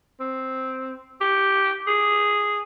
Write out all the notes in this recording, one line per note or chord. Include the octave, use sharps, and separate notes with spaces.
C4
G4
G#4